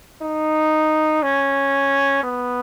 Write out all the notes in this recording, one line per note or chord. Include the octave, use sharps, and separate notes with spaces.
D#4
C#4
B3